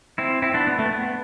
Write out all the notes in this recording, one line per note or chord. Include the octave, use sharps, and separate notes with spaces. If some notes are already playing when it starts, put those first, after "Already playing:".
C4 E4
C4 E4
B3 D4
B3
A3
B3